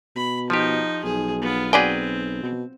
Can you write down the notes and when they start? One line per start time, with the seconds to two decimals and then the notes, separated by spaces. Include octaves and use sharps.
0.16 B2 B5
0.50 F3 D#4 G4
1.04 B1 G#4
1.41 B3 F4
1.73 F#3 C4 G#4 B4 D5 G5 G#5
2.43 B2